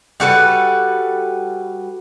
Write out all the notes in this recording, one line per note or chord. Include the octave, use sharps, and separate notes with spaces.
G3 F#4 A4 B4